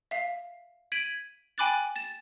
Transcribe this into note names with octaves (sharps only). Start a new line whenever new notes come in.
E5 F5
G#6 B6 D7 D#7 F#7
G5 G#5 B5 D6 F#6 A6
A6 E7